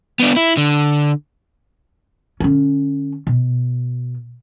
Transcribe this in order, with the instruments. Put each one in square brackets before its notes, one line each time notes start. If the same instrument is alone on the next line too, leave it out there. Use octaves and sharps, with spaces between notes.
[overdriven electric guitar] B3 D4
E4
D3
[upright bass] D3 C#4
B2